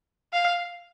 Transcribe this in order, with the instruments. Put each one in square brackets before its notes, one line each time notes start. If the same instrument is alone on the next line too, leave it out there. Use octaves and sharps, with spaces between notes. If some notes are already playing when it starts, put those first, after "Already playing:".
[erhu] F5